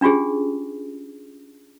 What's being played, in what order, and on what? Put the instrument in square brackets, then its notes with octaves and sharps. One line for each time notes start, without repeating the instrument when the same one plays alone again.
[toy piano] C#4 D4 F4 G4 G#4